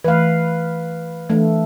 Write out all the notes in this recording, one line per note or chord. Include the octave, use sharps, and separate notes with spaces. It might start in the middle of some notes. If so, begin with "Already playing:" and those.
E3 A3 B4 F5
E3 A3 D4